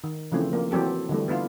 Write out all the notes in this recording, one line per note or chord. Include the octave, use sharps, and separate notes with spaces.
D#3
C#3 E3 F3 A3 C4
F3 A#3
E3 F#3 C4 G4 A4
D3 E3 G3 A3
B3 D4 E4 F4